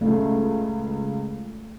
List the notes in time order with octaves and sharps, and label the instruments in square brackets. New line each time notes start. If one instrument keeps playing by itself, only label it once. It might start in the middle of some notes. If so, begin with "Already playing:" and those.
[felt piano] C#2 C#3 [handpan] A3